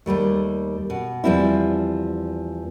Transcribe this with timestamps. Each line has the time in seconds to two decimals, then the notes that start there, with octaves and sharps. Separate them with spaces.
0.06 D#2 G#2 G3 A3
0.90 B2
1.24 E2 F3 G3 C4 E4